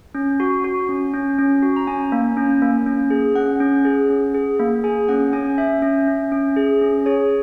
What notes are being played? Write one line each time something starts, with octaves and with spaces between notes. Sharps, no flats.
C#4
F#4
F#4
C#4
C#4
C#4
F#4
A#5
C#4 G#5
A#3
C#4
A#3
C#4
G#4
C#4 F#5
C#4
G#4
C#4
G#4
A#3
G#4 G#5
C#4 F#5
C#4 G#5
C#4 E5
C#4
C#4
C#4
G#4
C#4
G#4 C#5